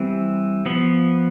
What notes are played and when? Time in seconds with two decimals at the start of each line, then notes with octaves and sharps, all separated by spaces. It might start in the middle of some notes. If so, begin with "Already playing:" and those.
Already playing: E3 G3 C4
0.66 F3 B3